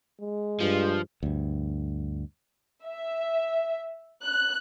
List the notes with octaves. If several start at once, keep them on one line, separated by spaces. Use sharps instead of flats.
G#3
G2 F3
D2 G2
E5
F#6